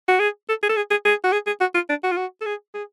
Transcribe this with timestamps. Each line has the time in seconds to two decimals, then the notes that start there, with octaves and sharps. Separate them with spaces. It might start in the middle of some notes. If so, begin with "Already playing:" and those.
0.08 F#4
0.19 G#4
0.49 A4
0.63 G#4
0.69 A4
0.76 G#4
0.91 G#4
1.05 G#4
1.24 F#4
1.33 G#4
1.46 G#4
1.61 F#4
1.75 F4
1.89 D4
2.04 F#4
2.12 F4
2.17 F#4
2.41 A4
2.46 G#4
2.74 G#4